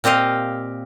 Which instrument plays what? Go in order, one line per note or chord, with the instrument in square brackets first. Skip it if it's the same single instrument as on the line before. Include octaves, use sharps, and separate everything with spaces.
[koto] A#2 C4 G4 D#5 F5